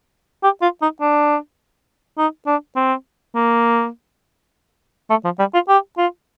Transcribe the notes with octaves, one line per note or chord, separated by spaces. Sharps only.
G4
F4
D#4
D4
D#4
D4
C4
A#3
A3
F3
G3
F4
G4
F4